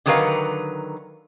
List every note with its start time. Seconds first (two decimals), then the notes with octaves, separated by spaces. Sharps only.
0.06 D3 D#3 F#3 A#4 B4 F5